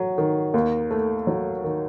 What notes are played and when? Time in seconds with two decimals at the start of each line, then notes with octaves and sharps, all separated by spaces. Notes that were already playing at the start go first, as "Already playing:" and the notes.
Already playing: F#3
0.18 D#3
0.54 D#2
0.91 A3
1.27 F#3
1.64 D#3